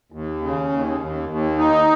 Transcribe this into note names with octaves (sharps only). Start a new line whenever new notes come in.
D#2
C#3
D#2
D#2
D#2
D#4